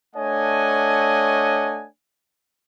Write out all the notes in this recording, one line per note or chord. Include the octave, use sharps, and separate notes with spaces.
A3 D4 C#5 D#5 F#5 G#5